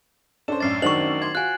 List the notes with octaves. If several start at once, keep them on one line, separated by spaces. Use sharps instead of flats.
C#4 D4 A4 C5 E7
A1 F#2 D5 A6 C7
D#3 F#3 D4 C5 C#6 F#7
D5 C6 G#6
F4 F#4 G#5 F#6